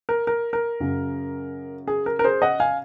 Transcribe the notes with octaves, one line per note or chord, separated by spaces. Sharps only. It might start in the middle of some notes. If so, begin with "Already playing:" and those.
A#4
A#4
A#4
F#2 C#3
G#4
A#4
A#4
G#4 C5
D#5 F#5
F5 G#5